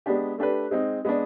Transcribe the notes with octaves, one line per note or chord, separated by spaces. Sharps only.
G#3 B3 D4 G4
A3 D4 G4 B4
G#3 C4 D#4
G#3 B3 D4